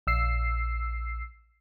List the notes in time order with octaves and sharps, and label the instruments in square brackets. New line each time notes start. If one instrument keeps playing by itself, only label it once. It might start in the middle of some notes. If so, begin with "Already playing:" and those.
[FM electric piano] A#1 E6 C7